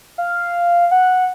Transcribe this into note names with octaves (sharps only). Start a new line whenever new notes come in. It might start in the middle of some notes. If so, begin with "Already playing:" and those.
F5
F#5